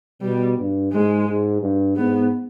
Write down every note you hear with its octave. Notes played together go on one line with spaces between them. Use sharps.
B2 G3
G2
G#2 G#3
G#2
G2
G#2 B3